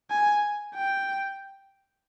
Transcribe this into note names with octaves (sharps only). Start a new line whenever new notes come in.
G#5
G5